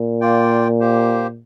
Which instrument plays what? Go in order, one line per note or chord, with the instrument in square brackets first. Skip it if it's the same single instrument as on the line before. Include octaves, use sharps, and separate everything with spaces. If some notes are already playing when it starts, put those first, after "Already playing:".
Already playing: [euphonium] A#2
[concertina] A#3 F4 D5 G5
A#3 G4 C5